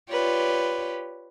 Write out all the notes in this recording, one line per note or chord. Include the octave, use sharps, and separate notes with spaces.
F4 G4 B4 C#5 D5